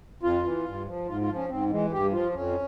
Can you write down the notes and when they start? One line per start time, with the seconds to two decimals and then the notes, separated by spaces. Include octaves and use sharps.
0.23 F2 F4
0.44 E3
0.65 G2
0.86 F3
1.08 G#2 F4
1.21 F4
1.29 F3
1.36 C#4
1.50 G#2 C4
1.71 E3 G#3
1.92 G2 G4
2.13 F3 F4
2.34 F2 C#4